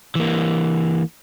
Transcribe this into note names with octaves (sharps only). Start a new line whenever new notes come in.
E3 A#3